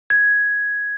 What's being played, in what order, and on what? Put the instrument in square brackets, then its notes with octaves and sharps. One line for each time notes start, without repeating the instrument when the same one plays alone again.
[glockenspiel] G#6